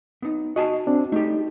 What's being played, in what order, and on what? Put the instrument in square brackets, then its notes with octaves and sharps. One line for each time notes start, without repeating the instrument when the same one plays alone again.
[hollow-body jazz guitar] B3 D#4
[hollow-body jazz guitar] F#4 G#5 A5 [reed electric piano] D#5
[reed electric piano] C4 D4
[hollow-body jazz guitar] A3 G4 [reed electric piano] D#4